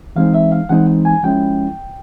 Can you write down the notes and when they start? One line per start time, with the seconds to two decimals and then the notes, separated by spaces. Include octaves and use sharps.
0.16 E3 G#3 C4 D#4 F5
0.34 E5
0.52 F5
0.69 E3 G#3 C4 D#4 F#5
1.05 G#5
1.23 F3 G#3 C#4 E4 G5